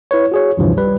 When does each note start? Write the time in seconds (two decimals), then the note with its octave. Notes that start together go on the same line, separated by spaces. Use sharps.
0.11 E4 B4 C#5
0.32 F#4 G#4 C#5
0.57 A1 D2 G2 C3 E3 F3
0.77 G3 B4